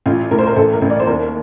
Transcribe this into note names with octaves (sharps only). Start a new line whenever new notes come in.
A1 F4
A2 A#4
C5
A#4
A1 A4
A#4
A1
D5
C5
D#2 A#4